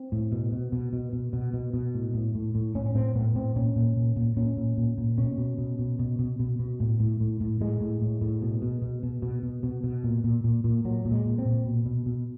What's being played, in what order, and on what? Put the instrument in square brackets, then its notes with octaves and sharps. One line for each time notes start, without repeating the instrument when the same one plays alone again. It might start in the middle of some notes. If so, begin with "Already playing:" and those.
Already playing: [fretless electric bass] C4
A2
B2
B2
B2
B2
B2
B2
B2
B2
A2
A2
A2
A2
A2 C#4
C#4
A2 C4
A2 B3
A2 C4
A#2 C#4
A#2
A#2
A#2
A#2 C#4
A#2
A#2
A#2
B2 C#4
B2
B2
B2
B2
B2
B2
B2
A2
A2
A2
A2
A2 G#3
A2
A2
A2
B2
B2
B2
B2
B2
B2
B2
B2
A#2
A#2
A#2
A#2
A#2 F#3
A#2
G#3
A#2
C4
A#2
B2
B2
B2